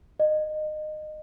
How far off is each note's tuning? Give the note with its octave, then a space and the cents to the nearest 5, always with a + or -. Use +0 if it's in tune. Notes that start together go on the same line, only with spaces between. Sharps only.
D#5 -25